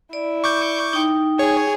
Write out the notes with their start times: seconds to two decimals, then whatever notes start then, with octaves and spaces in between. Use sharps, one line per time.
0.13 E4 D5
0.44 C#6 D6 G6
0.93 D#4 G5
1.39 G#4 C#5